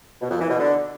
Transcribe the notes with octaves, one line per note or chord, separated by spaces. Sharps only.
B2
F2
E3
B2
D3